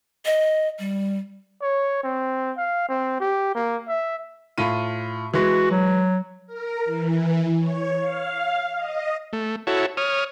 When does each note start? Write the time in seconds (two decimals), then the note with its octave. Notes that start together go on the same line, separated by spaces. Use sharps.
0.25 D#5
0.79 G3
1.61 C#5
2.03 C4
2.57 F5
2.89 C4
3.20 G4
3.55 A#3
3.88 E5
4.58 A2 F4 D#7
5.34 E3 G#3 F#4
5.71 F#3
6.47 A#4
6.85 E3
7.59 C#5
7.99 F5
8.76 D#5
9.33 A3
9.67 E4 F#4 A4 C#5
9.97 C#5 D#6 F6